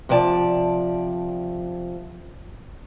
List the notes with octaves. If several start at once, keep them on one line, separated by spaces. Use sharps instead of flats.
C3 F3 D5 G#5 A5